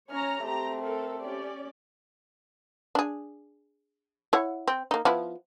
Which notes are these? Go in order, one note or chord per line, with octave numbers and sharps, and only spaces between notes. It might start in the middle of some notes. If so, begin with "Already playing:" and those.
C#4 C#5 A#5 F6
A3 C4 G4 A#5
A4 A#4
C#4 G4 D5
D4 G#4
E4 C#5 F#5
C4
A#3 D#4
F3 B3 E4